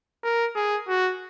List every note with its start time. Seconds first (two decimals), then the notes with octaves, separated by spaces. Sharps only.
0.23 A#4
0.55 G#4
0.88 F#4